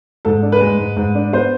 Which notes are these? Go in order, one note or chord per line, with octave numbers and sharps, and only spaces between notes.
G#2 A4
D4
B4
G#3
G#2
G#2
D4
B3 C5